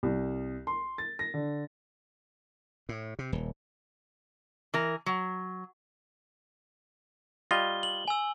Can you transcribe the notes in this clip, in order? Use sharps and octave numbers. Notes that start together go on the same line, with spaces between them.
C2
C6
A6
A#6
D3
A2
C3
D#1
E3 A#4
F#3
G3 F4 D#5 G7
F#7
G#5 E6